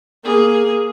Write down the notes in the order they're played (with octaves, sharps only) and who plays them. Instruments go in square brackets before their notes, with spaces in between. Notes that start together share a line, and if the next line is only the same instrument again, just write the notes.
[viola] A#3 G#4